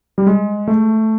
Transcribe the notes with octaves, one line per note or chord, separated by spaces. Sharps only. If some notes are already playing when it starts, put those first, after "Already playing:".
G3
G#3
A3